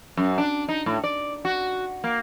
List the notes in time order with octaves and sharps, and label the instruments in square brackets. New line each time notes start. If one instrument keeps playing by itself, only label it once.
[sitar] F#2
D4
D#4
A2
D5
F#4
A#3